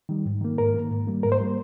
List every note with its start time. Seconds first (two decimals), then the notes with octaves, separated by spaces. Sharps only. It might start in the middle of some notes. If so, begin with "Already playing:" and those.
0.09 D#3 G3
0.26 G#2
0.41 D#3 A#3
0.58 G#2 A#4
0.74 D#3 A#3
0.91 G#2
1.07 G3 A#3
1.23 G#2 A#4
1.32 C5
1.41 G3 A#3